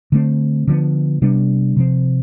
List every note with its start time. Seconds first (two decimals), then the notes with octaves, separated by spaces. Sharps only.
0.12 D3 A3 C4
0.67 D3 F3 B3
1.22 C3 G3 B3 D4
1.76 C3 F3 C4